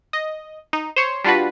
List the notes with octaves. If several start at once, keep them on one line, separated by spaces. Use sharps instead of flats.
D#5
D#4
C5 C#5
G3 D4 F4 F#4 B4